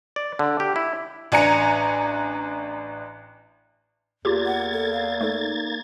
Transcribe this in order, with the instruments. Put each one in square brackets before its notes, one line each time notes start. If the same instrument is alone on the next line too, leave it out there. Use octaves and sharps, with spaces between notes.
[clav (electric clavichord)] D5
D3
G4
E4
[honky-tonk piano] A1 D4 G#5 A#5 C#7
[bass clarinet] E2 [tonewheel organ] A#3 G#6 A6 [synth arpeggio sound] F4 G4 G#4
[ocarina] F#5
A4
F5
[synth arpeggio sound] A3 A4 [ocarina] D#4